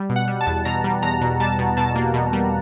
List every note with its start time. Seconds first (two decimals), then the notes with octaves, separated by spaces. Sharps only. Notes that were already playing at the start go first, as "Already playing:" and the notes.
Already playing: G3
0.09 B2
0.16 F#5
0.28 G3
0.41 A5
0.47 E2
0.65 B2 A#5
0.84 G3
1.03 E2 A#5
1.21 B2
1.40 G3 A5
1.59 B2
1.77 B2 A5
1.96 A#3
2.14 B2
2.33 G3